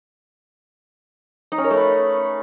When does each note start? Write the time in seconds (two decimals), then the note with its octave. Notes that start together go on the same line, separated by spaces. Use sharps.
1.52 D#4
1.58 C#4
1.64 A#4
1.71 A3
1.77 B4